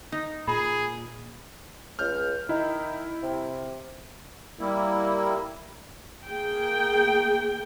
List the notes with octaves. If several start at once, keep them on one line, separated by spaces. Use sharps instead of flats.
D#4
A#2 G#4 B5
C#2 F6 G6
D#3 D#4 E4
C3
G3 A#3 E4
A#3 G#4 G5